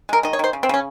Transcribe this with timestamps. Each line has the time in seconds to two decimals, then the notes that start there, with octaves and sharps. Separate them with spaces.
0.09 G#3 A#4
0.23 D#3 D#5
0.33 C#5
0.39 D#3 C5
0.53 C#3
0.63 C4
0.69 C#3 C#4